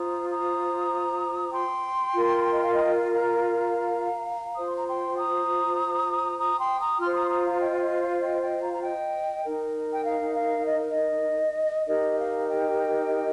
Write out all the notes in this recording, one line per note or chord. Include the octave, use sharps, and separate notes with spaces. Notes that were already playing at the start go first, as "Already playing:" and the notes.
Already playing: F4 C5 A#5 D#6
A#5 D#6
G5 C6
F4 A#4
D#5
F5
D#5 G5
G5
F5
C6
F5 A#5
F4 C5 D#6
C6
A#5
G5 C6
A#5 D#6
A#5 D#6
G5 C6
A#5 D#6
F4 C5 C6 F6
C6
A#5 D#6
C6
A#5 D#6
F5 A#5
D#5 G5
F5
D#5
F5
D#5 G5
D#5 G5
F5 A#5
A#5
D#5 G5
D#4 A#4
G5
F5
F5
D#5
D#5
D#4 G4 A#4 D#5
F5
D#5 G5